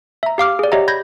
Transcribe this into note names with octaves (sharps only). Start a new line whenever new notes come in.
E5 A#5
G4 F5 D6 F6
G#4 D5
G4 C#5 D#5 E5 F#5 A#5
B5 G6 G#6 A#6